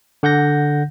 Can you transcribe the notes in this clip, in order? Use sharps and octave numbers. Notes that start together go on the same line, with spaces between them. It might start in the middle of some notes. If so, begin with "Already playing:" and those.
D3 F#5 G6 A#6